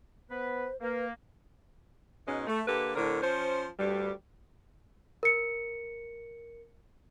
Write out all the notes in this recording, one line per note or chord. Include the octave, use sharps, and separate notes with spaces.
B3 B4 C5
A#3 B4
G#2 B2 G#3 C#4
A3
D3 A#3 G4 A4 B4
A2 D3 C4 A#4
F3 C#4 C5
D2 G2 G3
A#4 C#7